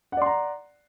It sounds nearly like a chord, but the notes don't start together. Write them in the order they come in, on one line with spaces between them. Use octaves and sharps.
F#5 D5 C6 A#5